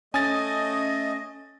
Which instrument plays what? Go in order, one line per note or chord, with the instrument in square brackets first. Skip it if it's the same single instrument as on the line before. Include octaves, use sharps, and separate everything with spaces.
[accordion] A3 D#5 [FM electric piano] C#4 D#6 [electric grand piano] G#5 A6